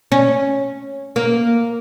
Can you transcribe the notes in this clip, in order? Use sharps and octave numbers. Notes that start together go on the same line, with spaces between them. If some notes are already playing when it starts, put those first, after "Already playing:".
C#4
A#3